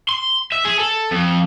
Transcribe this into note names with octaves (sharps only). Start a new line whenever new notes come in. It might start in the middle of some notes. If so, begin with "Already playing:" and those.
C6
E5
G#4
A4
F2